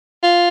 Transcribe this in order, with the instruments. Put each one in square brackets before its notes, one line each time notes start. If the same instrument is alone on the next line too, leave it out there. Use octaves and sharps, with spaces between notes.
[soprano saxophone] F4